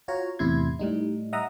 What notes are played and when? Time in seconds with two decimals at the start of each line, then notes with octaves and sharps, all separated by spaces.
0.08 F4 F#4 C#5 A#5
0.39 E2 A2 C3 E4 C6 G#6
0.79 A2 G3 D#4
1.33 D#5 E5 F#5 A#5 D#6